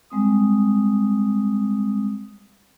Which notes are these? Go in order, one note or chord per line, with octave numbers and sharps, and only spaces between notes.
G3 G#3 C4 D#6